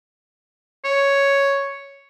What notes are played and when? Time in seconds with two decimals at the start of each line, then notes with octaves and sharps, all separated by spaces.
0.85 C#5